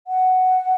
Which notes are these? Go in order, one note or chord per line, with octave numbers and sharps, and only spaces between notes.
F#5